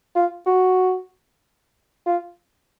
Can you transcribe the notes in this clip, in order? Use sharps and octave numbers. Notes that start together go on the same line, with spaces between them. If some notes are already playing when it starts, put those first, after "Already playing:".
F4
F#4
F4